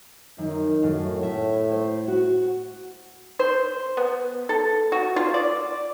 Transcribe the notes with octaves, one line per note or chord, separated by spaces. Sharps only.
F#2 D#3 D#4
F#2 A2
E5
C5
F#4
C5
B3
A4
F#4
F4
D5